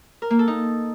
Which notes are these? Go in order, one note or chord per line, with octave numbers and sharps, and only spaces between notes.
A#4
A#3
A4
D#4